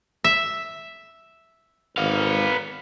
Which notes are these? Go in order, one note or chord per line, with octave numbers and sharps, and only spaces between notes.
E5
G#1 B3 F5